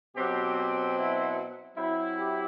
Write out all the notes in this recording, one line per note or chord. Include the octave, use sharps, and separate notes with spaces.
B2 F#3 C4 G4
G4
E4
F#3 C4 E4
G4